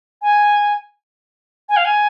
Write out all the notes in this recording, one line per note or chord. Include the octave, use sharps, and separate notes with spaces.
G#5
G#5
F5
G#5